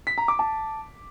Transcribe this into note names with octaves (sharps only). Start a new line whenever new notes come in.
B6
A#5
D6
A5